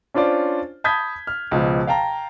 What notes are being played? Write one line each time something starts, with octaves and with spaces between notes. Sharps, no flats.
C#4 D4 F4 C5 D5
A5 B5 D#6 G6 G#6 B6
F6
C#2 B2 F3
F5 G5 A5 A#5